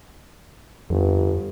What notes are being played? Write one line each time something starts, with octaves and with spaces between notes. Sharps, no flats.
G1 F2